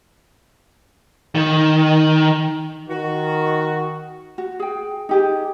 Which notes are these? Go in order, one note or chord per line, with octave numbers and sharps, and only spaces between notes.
D#3
D#3 F#4
F#4
G#4 G5
D#4 G4 G#4